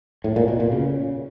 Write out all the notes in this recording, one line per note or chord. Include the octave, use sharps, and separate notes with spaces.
A2
A#2
B2
A#2
C#3